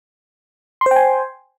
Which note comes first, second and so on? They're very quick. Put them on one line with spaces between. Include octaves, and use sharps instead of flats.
C6 C5 G5 G#5